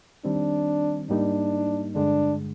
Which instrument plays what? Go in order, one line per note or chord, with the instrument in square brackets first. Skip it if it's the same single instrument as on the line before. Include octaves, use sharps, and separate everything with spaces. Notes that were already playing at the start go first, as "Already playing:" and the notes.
[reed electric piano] D#3 G3 C4 [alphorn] D4
[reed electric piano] G#2 G3 A#3 D#4 [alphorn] D4
[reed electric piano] G2 D3 G#3 [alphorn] D4